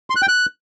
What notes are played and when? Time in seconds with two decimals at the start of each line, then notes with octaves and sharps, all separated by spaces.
0.10 C6
0.16 F#6
0.22 G5
0.29 F#6